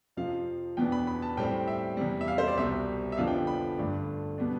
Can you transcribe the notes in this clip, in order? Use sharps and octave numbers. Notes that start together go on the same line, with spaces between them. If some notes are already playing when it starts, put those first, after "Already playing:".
F2 C3 F3 F5
E2 B2 B3 D4 G5
B5
B5
A5
A2 G3 C4 G5
E5
E2 C3 G3
E5
F5
C5
D5
C2 B2 G3 E5
E5
F2 D3 F3 B3 D4 F5
G5
B5
G2 D3 A3 D4
B2 G3 B3 D4